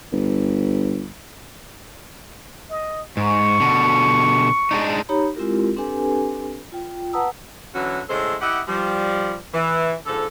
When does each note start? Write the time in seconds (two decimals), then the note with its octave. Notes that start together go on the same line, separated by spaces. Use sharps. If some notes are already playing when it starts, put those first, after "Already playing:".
0.12 G1
2.71 D#5
3.17 G#2 C#6
3.60 B2 D3
4.71 G#3 D4 D#4
5.09 D#4 G4 C#5 A#5 B5
5.36 G#3 C4 E4 F4 G4 A#4
5.76 C4 D4 G4 A4 B4 G#5
6.72 F4 G5
7.13 B4 F#5 A5 A#5 D#6 E6
7.75 D3 E3 F#3 C#4 F#4
8.09 A2 C#3 G#3 A4 C5
8.41 E4 G4 D#5 F#5
8.67 F3 G3
9.53 E3
10.06 G#2 D3 F3 A4